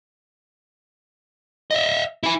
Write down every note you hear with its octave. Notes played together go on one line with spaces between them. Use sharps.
D#5 E5
E4 G#5